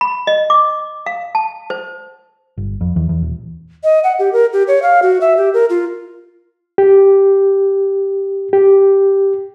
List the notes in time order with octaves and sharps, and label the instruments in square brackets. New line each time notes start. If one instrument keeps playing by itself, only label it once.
[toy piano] B5
D#5
D6
F5
A5
C5
[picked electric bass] G1
F2
E2
E2
D#1
[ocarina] D#5
F#5
G4
A#4
G4
C#5
F5
F#4
E5
G4
A#4
F4
[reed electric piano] G4
G4